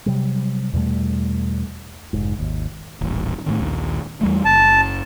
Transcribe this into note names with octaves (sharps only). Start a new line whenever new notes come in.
C3 F#3 G3
E2 B2 G3 A3
F1 G#2
G#1 D#2
D#1 A1
A2 C3 D#3
A#1 D#2
E2 G3 A3
F#1 A5